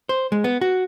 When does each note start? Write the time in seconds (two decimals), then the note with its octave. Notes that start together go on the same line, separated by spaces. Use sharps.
0.09 C5
0.32 G#3
0.44 B3
0.61 F#4